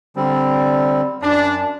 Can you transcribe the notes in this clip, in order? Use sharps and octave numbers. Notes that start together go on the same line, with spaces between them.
D3 G3 C4
F#2 D4